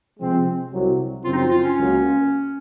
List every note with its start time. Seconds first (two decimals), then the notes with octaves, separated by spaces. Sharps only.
0.19 C3 F3 G#3 C4
0.72 C2 C3 F#3
1.24 F#2 C#3 F3 C4 F4
1.33 D#4
1.37 F4
1.51 F4
1.64 C#4
1.77 C#2 C#3 F#3 A#3